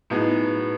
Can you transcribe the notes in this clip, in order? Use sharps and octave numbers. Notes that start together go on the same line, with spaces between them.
A2 F#3 B3 D#4 G#4